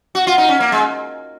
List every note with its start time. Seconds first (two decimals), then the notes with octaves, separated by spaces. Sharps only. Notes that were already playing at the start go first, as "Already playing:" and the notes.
0.15 F#4
0.27 F4
0.38 D#4
0.49 C#4
0.60 A#3
0.72 G#3